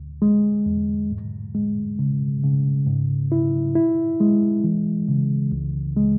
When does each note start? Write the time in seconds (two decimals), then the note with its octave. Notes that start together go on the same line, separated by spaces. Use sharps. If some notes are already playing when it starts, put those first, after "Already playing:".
Already playing: D2
0.22 G#3
0.66 E2
1.11 G#2
1.55 G#3
1.99 C#3
2.44 C#3
2.87 G#2
3.32 E4
3.75 E4
4.20 G#3
4.64 E3
5.08 C#3
5.52 C#2
5.97 G#3